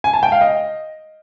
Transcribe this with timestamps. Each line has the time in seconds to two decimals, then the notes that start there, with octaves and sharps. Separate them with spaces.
0.04 G#5
0.13 A5
0.23 G5
0.32 F5
0.41 D#5